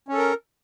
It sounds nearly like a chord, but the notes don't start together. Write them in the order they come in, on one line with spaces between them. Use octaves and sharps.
C#4 A4 A#4